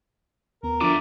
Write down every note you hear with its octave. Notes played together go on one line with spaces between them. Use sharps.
D#2 B3 A#4
D3 F3 A3 D4 F4 D6